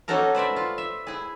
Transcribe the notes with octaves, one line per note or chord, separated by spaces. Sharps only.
A#3 C#4 D#4 F#4 A4 A#4
B4 C5 D5 E5
F4
E5
E4 G#4